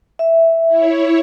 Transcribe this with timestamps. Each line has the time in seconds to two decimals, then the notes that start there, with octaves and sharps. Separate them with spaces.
0.19 E5
0.68 E4 C#5